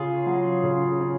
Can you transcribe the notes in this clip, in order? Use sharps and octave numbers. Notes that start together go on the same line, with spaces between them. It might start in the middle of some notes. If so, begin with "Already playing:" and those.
Already playing: C#3 C#4 F4 G#4
F#3
C#3
C#4